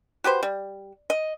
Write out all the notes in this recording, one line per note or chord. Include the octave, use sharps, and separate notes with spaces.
F#4 G4 B4 C5
G3
D#5